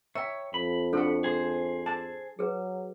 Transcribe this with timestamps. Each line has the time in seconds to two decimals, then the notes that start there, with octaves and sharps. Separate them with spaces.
0.15 C#5 E5 G5 A#5
0.54 F2 B5
0.93 D4 F#4 A4 F#5
1.24 G#4 C5
1.86 A5
2.39 F#3 G#4 B4